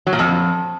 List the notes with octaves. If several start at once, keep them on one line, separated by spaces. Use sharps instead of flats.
F#3
A#2
F2